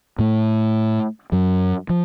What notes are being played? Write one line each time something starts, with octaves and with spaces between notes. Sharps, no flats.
A2 A3
F#2 F#3
F3